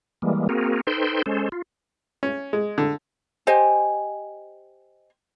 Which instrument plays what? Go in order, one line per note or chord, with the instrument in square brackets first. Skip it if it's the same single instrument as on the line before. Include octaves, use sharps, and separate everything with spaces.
[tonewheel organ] E3 G3 G#3 A#3
A#3 C4 F#4 G#4 A#4
D#4 A4 B4 C5 G5 C6
G#3 C#4 A4 C5
F4
[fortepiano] C#4
G#3
D3
[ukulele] G4 C5 D#5 G#5